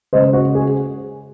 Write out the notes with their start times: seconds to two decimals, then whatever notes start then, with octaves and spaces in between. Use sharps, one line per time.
0.13 C#3 G#3 C5 D#5
0.33 F#4
0.55 G#4